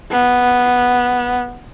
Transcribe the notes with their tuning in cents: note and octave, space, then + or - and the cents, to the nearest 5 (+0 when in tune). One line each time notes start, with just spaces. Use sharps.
B3 -5